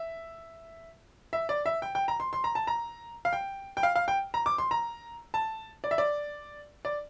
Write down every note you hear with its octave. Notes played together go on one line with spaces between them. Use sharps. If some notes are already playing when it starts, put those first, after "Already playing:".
Already playing: E5
E5
D5
E5
G5
G5
A#5
C6
C6
A#5
A5
A#5
F5
G5
G5
F5
F5
G5
A#5
D6
C6
A#5
A5
D5
E5
D5
D5